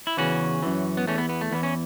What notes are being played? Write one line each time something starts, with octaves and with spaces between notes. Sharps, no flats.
E4
E2 C#3 E3 C#4 F#4
F#2 E3
B3
E2 E3 A3 C#4
B3
B3
A3
E2 E3 B3
C#4